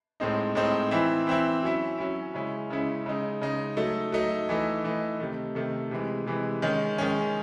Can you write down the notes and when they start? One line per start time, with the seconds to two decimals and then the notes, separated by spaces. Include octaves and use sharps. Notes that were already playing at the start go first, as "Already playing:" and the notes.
0.20 A2 G#3 C4 D#4
0.55 A2 G#3 C4 D#4
0.91 E3 C4 E4
1.27 E3 C4 E4
1.63 F#3 C#4 E4
1.98 F#3 C#4 E4
2.34 C#3 G#3 C#4 E4
2.70 C#3 G#3 C#4 E4
3.06 C#3 G#3 D#4
3.41 C#3 G#3 D#4
3.77 F#3 A3 D#4
4.12 F#3 A3 D#4
4.49 E3 A3 D#4
4.84 E3 A3 D#4
5.20 C3 D#3 A3
5.55 C3 D#3 A3
5.91 C3 E3 G#3
6.27 C3 E3 G#3
6.62 D#3 G#3 C#4
6.98 D#3 G#3 C#4